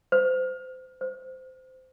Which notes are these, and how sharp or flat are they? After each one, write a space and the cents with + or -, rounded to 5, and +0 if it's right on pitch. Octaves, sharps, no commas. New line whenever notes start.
C5 -30
C5 -20